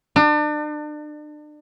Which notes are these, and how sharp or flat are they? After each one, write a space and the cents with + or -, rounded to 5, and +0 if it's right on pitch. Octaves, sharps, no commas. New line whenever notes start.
D4 +35